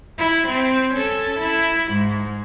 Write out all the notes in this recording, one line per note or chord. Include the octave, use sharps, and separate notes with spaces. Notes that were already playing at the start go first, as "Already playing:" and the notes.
E4
C4
C#4 A4
E4
G#2